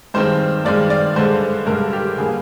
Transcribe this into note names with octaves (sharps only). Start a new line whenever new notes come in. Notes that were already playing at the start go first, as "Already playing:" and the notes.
G2 D#3 G#3 C4 C5
G2 D#3 G#3 C4 D5
D5
G2 D3 G#3 C5
G2 D3 G#3 A#4
G4
D3 G3 A#3 G#4